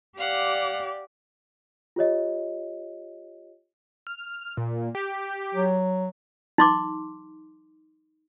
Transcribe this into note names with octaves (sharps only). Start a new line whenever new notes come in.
G4 D5 F5 F#5
F4 G4 C#5 D#5
F6
A#2
G4
F#3
D#4 C6 D6